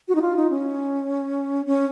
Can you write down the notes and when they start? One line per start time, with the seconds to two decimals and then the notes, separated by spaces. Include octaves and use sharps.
0.08 F#4
0.15 D#4
0.22 F4
0.36 D#4
0.50 C#4
1.66 C#4